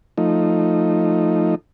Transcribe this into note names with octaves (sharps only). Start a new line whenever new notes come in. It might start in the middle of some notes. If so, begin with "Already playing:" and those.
F3 A3 D#4